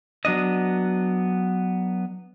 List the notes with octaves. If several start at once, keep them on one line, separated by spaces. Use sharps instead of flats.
F#3 B3 D4 D#5